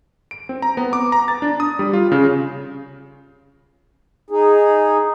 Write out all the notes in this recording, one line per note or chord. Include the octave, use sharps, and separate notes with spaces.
D7
C4
A#5
B3
D6
A#5
A6
D4
D#6
G3
F4
C#3
D#4 G#4